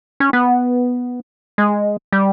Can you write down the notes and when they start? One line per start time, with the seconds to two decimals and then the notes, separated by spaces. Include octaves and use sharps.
0.20 C#4
0.33 B3
1.58 G#3
2.12 G3